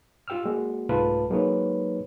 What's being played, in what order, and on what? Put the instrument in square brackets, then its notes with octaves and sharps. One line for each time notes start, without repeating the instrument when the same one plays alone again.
[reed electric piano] F4 G4 G5 E6 F6
G#3 A#3 F#4
C2 G#2 A3 F4 B4 A5
F#3 G#3 A#3 D#4 B4 C#5